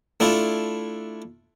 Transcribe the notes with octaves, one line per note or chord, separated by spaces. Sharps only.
A3 D4 E4 F4